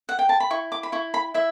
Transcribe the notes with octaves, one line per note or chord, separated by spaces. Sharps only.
F#5
G5
A5
B5
E4 C#6
D6
B5
E4 C#6
B5
E4 E5